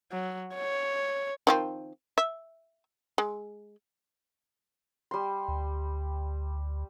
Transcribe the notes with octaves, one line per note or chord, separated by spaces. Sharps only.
F#3
C#5
D#3 F3 C4
E5
G#3
G3 C6
D2